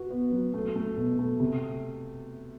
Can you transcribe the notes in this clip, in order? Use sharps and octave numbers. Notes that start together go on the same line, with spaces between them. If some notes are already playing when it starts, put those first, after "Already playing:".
Already playing: F#4 B4
B3
F#3
A3
A3
B2
A3
C3